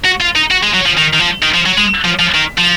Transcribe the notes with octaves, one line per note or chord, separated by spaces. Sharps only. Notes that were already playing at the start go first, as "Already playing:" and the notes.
F#4
F4
D#4
F#4
G#3
F#3
F3
D#3
D#3
F3
D#3
F3
F#3
G#3
F3
F3
D#3
F3